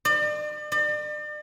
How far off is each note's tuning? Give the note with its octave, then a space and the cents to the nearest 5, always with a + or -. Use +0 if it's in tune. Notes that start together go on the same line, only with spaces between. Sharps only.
D5 +40
D5 +40